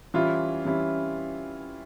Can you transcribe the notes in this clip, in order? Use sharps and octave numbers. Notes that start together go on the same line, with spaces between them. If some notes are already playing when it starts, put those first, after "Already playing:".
E3 G3 C#4 E4 F4
E3 G3 C#4 E4